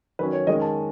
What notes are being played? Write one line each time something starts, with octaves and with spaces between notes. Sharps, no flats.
D#3 F#3 C#4 B4
C#5
D#3 G#3 C#4 D#5
A5